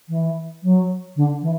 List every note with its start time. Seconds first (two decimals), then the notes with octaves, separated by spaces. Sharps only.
0.09 E3
0.63 F#3
1.16 D3
1.42 E3